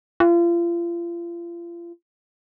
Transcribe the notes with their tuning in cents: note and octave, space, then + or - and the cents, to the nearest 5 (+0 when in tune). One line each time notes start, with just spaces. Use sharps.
F4 -35